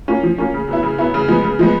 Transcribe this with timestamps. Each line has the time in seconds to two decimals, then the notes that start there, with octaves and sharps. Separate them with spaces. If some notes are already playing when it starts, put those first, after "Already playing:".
0.08 A#3 C#4 F4
0.23 F3
0.38 A#3 C#4 F4
0.54 C#3
0.68 F#3 B3 E4
0.83 C#3
0.98 F#3 B3 E4
1.14 C#3
1.28 F3 G#3 B3
1.44 C#3
1.59 F3 G#3 B3